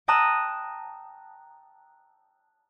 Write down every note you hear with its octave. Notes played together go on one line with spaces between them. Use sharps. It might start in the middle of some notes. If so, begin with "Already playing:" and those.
G5 A5 A#5 D#6 E6 F#6